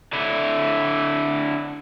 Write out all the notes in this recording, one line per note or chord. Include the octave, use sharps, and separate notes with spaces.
D3 E4